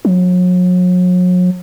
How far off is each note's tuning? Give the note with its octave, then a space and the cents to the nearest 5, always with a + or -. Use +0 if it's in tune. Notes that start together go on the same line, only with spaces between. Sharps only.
F#3 -40